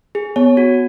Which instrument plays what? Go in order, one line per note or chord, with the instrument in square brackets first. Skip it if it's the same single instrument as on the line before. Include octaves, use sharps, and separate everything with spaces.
[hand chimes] G#4
[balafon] B3 [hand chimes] C#5
[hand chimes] F#4